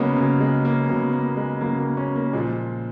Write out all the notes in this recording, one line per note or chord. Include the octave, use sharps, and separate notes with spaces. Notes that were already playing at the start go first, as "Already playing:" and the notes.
Already playing: C#3 F#3 G#3 A#3 B3 C#4
C#3 F#3 A#3
G#3
A#3
C#3 F#3 B3
A#3
G#3
C#3 F#3 A#3
A#3
C#4
A#3
A#2 F3 G#3